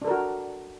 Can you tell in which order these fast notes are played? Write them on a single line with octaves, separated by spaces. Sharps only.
D4 A4 A#4 F#4